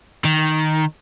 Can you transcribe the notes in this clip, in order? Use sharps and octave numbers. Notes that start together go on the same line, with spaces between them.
D#3